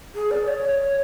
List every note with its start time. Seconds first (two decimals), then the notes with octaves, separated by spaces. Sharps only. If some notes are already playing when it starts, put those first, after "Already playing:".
0.15 G#4
0.31 D5
0.47 C#5